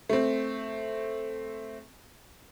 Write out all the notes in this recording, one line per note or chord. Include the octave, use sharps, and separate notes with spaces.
A3 C4